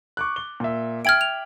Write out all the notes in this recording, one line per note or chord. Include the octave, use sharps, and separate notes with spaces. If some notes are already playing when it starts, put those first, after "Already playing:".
C#6 D6 F#6
G7
A#2 E5
E5 G5 F6 G#6 D7 F#7
F7